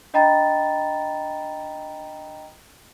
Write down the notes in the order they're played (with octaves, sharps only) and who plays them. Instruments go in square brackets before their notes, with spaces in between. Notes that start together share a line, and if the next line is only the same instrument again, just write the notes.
[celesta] D4 D#5 G5 A#5 B5 A6